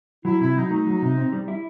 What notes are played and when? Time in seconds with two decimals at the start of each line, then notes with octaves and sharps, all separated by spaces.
0.25 F#3 E4
0.41 C3 E4
0.56 F#3 D#4
0.71 A3 D#4
0.87 F#3
1.02 C3
1.17 C4
1.33 G3
1.48 E4